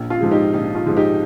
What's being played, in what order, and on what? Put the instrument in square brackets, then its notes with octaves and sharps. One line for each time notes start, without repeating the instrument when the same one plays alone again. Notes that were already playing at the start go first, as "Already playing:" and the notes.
Already playing: [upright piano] A#1
F4
G#2 F3 G#3
D#4 G4
A#1 D#4
F4
G#2 F3 G#3
D#4 G4